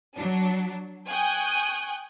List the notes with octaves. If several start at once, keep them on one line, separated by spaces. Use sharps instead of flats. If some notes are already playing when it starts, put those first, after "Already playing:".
F#3 D4
G5 G#5 C#6 D#6 F#6 G6